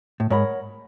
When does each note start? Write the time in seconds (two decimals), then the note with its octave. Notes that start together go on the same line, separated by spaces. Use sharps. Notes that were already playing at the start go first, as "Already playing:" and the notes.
0.20 A2
0.30 G#2 A#4 C#5 F#5 B5